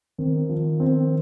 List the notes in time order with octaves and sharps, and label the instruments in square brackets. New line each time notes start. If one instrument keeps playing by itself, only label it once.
[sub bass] D#3 [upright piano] C4
[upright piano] F3
C4